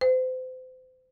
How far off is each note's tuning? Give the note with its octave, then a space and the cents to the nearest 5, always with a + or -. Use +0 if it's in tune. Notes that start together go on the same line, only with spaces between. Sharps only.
C5 -35